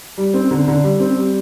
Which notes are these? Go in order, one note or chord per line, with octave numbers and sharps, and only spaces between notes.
G3
C4
D3
D3
G3
C4
G3